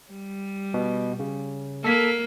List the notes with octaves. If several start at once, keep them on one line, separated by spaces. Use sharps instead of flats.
G3
B2
C#3
A#3 A4 B6